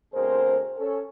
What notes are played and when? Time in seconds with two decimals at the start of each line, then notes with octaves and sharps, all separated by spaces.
0.14 D2 B2 C4 G#4 A#4 C5
0.78 C#4 A4